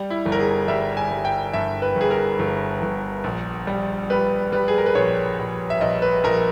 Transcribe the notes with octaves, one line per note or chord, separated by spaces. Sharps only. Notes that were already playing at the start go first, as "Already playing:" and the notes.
Already playing: G3
E4
G1
A#4
G#4
G3 E5
G#5
G3
G5
G2 E5
B4
G1 G#4
A#4
G1
G1
A#1
G3
G3 B4
G3 B4
G#4
A#4
B4
A#1 C#5
A#1
E5
A#1 D#5
B4
A#1 A#4